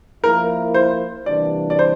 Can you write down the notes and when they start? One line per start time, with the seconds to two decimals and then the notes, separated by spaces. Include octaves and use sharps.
0.23 F3 A#3 E4 A#4
0.74 C5
1.26 C3 E3 G3 A#3 D4 D5
1.70 D5
1.79 C5